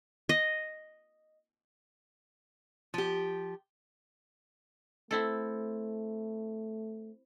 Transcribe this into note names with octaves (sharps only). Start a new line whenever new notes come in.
D#5
F3 G4
A3 C4 E4 A4